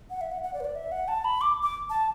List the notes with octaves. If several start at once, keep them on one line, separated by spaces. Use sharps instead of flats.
F#5
E5
F#5
F#5
D5
B4
D5
E5
F#5
A5
B5
D6
D6
A5